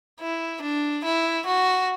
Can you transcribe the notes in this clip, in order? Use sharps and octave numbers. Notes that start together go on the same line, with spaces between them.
E4
D4
E4
F#4